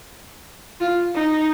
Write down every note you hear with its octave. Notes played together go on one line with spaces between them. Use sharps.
F4
D#4